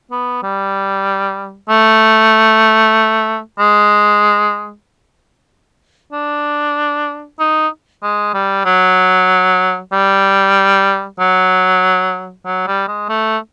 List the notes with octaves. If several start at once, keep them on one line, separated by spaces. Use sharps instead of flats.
B3
G3
A3
G#3
D4
D#4
G#3
G3
F#3
G3
F#3
F#3
G3
G#3
A3